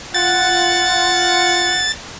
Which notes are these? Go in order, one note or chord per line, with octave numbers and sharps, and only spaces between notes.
F4 F#5 A6